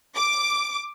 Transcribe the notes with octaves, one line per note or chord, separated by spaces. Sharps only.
D6